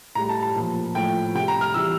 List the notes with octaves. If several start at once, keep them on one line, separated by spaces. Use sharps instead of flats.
A2 G3 A#5
A5
A5
A#2 F3
A2 F3 G5
C3 G3 G5
A#5
F6
C3 E3 G3 E6